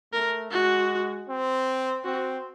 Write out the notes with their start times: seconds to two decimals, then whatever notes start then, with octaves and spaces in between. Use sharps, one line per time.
0.13 A3 A#4
0.52 G#3 F#4
1.29 C4
2.04 C4 F#4